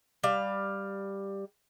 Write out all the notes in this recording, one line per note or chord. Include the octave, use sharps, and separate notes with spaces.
G3 F5